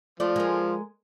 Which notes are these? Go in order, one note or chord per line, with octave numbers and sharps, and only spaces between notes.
F3 A3 D5
G#3 A#4